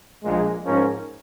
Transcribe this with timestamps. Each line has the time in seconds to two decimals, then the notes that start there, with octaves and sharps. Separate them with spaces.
0.24 A#1 A#2 G#3
0.64 G#2 F3 C#4 A#4